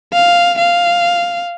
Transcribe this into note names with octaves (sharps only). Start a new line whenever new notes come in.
F5
F5